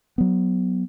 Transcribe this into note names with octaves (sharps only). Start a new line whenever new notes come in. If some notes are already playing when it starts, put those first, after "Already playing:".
F#3 B3